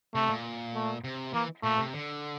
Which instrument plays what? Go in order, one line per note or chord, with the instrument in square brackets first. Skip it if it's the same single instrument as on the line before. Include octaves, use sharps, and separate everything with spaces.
[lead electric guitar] C3 [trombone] A3
[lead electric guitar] A#2
[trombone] A3
[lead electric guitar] C3
[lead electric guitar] E3 [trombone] A#3
[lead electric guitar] A#2 [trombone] A3
[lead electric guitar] C3
D3